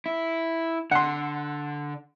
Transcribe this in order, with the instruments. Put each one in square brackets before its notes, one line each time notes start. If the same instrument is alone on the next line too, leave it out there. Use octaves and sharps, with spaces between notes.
[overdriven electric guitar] E4
[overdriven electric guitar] D3 [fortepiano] F#5 C6